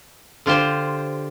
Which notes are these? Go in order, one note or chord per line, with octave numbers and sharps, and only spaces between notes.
D3 F4 G4 C5